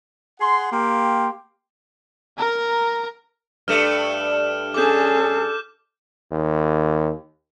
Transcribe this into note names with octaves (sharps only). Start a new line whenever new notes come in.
G#4 F#5 C6
A#3 G4 F5 G5 C6
A#4 A#5
G2 A3 F6 E7
C#4 G#4 A4 D6 G6
D#2